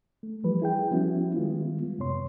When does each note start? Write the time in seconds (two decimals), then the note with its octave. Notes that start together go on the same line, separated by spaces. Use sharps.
0.23 A3
0.44 E3 F3 G3 B4
0.62 E4 G#4 G5
0.91 F3 G3 B3 C#4 E4 F#4
1.36 D#3 G3 G#3 B3 F4
1.99 F#2 C3 B3 C#5 C6